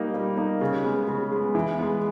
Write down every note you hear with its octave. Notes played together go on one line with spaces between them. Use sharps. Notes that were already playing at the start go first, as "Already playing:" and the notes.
Already playing: G3 A#3 D#4
G3
A#3 D#4
C#3
G#3 B3
C#3
G#3 B3
E3
G#3 B3